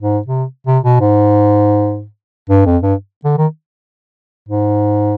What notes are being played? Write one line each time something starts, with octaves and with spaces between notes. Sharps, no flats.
G#2
C3
C3
B2
G#2
G2
F2
G2
D3
D#3
G#2